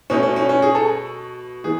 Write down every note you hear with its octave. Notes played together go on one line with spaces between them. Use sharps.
B2 A3 C#4
C#4
C#4
C#4
G#4
A4
E3 B3 G#4